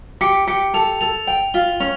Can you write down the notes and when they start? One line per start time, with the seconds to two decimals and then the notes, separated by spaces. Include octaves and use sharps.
0.21 G4 C#7
0.47 G4 C#7
0.74 A4 F7
1.01 A4 F7
1.27 G5 F7
1.54 F4 G7
1.80 C#4 F7